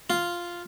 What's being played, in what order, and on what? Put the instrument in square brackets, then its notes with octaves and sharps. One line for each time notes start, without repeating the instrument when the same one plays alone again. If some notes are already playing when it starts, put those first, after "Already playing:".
[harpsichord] F4